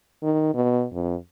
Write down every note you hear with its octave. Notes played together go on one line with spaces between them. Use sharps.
D#3
B2
F2